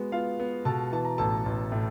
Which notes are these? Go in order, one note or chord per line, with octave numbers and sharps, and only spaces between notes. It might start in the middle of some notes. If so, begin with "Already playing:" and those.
Already playing: G#3 B3 F#4
B3 F4 F5
B3
B2 A4 A5
E3 A5
A#5
A1 A4 A5
A1
A2